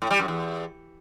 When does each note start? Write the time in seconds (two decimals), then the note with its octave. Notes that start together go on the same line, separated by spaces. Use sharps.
0.02 A2
0.11 G3
0.19 F#2
0.28 E2